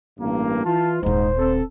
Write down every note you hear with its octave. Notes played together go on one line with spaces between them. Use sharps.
A1 G2 A#3
E3 F4 A5
D#1 G#2 D#4 E4 C5
C4 A4